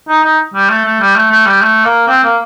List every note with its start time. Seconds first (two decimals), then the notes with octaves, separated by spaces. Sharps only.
0.08 D#4
0.24 D#4
0.54 G3
0.70 A3
0.85 A3
1.00 G3
1.16 A3
1.31 A3
1.46 G3
1.62 A3
1.84 A#3
2.08 C4
2.24 A#3